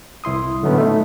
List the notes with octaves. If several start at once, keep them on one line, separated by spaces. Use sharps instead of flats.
C2 E4 C6 D#6
A2 D3 F#3 A3 B3 C#4
A3 D#4